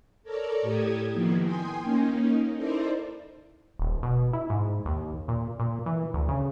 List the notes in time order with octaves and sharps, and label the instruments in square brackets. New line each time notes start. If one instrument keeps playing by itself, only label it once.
[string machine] A4 A#4 C#5 D5 A#5
A2 G4 A4 D#6 G#6
D#3 F3 A#3 B3 E4
G5 G#5 C6 D#6
A#3 C#4 D#4
D#4 E4 A4 A#4 C5 D5
[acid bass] D#1
B2
E4
G#2
D#2
A#2
A#2
E3
D2
C#3